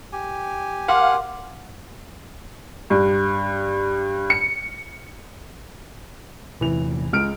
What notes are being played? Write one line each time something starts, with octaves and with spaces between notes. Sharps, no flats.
G4 G#5
A#4 F5 F#5 C6 D6
G2
C#7
E2 C3 E3 F7
C#2 F6 D7